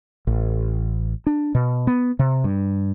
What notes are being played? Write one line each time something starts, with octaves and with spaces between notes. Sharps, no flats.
A1
D4
B2
B3
C3
G2